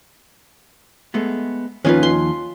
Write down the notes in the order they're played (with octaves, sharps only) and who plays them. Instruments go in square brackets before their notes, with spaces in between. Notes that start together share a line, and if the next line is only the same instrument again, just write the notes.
[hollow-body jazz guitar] G#3 A3 B3
[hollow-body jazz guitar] D#2 F3 D#4 [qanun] C#4 F4 B4
[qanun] C6